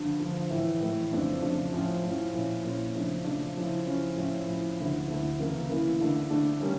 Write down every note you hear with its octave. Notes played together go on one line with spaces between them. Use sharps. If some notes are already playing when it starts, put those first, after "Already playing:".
Already playing: G2 D3 F3
G2 D3 F3
A2 E3 A3 E4
A2 E3 A3 E4
F2 C#3 F3 A3 D4
F2 C#3 F3 A3 D4
A2 F3 C#4 E4
A2 F3 C#4 E4
A#2 F3 C#4 E4
A#2 F3 C#4 E4
C#3 F3 A3 D4
C#3 F3 A3 D4
C#3 F3 C#4 E4
C#3 F3 C#4 E4
A2 F3 C#4 E4
A2 F3 C#4 E4
D2 D3 A3 E4
D2 D3 A3 E4
C#3 E3 A#3 E4
C#3 E3 A#3 E4
G2 D3 A3 D4
G2 D3 A3 D4
C#3 G3 A#3 C#4